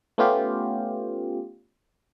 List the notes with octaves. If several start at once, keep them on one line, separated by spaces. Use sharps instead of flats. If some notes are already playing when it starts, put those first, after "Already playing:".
A3 B3 C#4 F4 G4